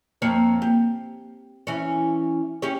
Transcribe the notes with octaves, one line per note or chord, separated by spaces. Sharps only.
F2 A#3 C#5
G4
E3 C#4
C#4 G4 C#5